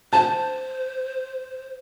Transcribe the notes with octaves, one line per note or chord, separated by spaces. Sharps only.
C5 A5